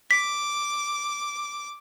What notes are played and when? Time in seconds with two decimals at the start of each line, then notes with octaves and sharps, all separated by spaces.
0.11 D6 B6